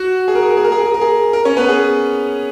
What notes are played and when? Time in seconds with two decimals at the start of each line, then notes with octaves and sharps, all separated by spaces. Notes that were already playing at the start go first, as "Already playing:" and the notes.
Already playing: F#4 F#5
0.28 G#4
0.35 A#4
0.42 G#4
0.50 A#4
0.57 G#4
0.64 A#4
0.72 G#4
0.79 A#4
0.86 G#4
0.94 A#4
1.01 G#4
1.33 A#4
1.45 C#4 C#5
1.56 B3 B4
1.69 G#4